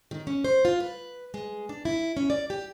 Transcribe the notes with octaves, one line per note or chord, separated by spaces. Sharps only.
D#3
C#4
C5
F4
B4
G#3
D4
E4
C#4
D5
G4